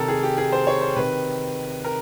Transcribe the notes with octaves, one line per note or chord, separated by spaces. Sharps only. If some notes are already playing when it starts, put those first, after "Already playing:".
Already playing: C3 D#3 A4 A#4
G#4
G4
G#4
C5
C#5
C5
C3 D#3 B4
A#4